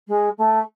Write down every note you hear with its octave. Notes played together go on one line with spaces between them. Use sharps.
G#3
A3